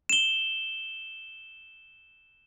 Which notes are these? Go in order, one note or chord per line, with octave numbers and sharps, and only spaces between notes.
E7 G7